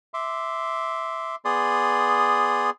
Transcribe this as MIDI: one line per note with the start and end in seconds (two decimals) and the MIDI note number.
0.14 1.36 76
0.14 1.36 84
0.14 1.36 86
1.45 2.70 59
1.45 2.70 68
1.45 2.70 74
1.45 2.70 84
1.45 2.70 87